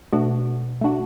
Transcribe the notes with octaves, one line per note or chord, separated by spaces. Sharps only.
B2 A3 D4 F#4
A3 D4 F#4